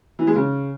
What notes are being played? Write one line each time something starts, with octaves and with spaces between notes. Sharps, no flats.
E3
G#3
C#3